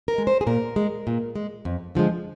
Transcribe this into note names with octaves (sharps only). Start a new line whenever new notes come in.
A#4
G#3
C5
G#4
A#2 A#4
G#3
A#2
G#3
F2
D3 F3 G#3